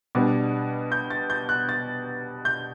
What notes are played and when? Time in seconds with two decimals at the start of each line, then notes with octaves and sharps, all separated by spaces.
0.15 B2 G3 B3 D4
0.92 G6
1.10 A6
1.30 G6
1.49 F#6
1.69 A6
2.45 G6